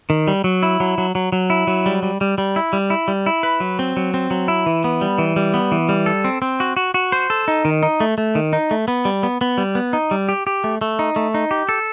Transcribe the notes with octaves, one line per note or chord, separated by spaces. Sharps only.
D#3
G3
F#3
E4
F#3
F#3
F#3
F#3
E4
F#3
G3
G3
G3
G3
E4
G3
E4
G3
E4
B4
F#3
C4
F#3
C4
F#3
E4
E3
B3
G3
E3
G3
B3
E3
G3
A4
C4
C4
F#4
F#4
F#4
C5
A4
D#4
D#3
D#4
A3
A3
D#3
D#4
A3
B3
G3
B3
B3
G3
B3
D#4
G3
G4
G4
A3
A3
D#4
A3
D#4
G4
A4